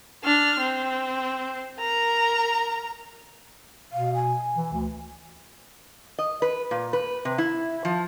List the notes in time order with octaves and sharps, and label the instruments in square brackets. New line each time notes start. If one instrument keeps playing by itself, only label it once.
[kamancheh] D4 F6
C4
A#4 A#5
[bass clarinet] B2 [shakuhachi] F5
[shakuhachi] G#5
[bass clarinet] E3
D2
[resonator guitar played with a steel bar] D#5
B4
A#2
B4
C3
E4
F3